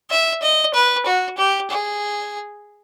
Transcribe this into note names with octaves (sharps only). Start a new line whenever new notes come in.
E5
D#5
B4
F#4
G4
G#4